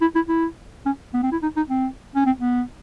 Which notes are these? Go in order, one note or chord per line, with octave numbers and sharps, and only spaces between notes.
E4
E4
E4
C#4
B3
C4
E4
D#4
D#4
C4
C#4
C4
B3